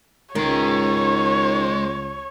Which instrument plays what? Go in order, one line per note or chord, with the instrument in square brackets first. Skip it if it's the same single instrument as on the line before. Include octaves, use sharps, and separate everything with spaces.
[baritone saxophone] C#2 [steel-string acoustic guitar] D#3 [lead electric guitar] G#3 A#5 [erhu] C#5